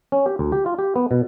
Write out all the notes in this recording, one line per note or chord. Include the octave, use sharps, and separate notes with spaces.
C#4
G4
D2
G4
F4
G4
B3
B2